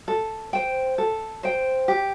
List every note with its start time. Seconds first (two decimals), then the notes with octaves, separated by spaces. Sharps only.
0.08 A4
0.53 C5 G5
0.98 A4
1.43 C5 G5
1.88 G4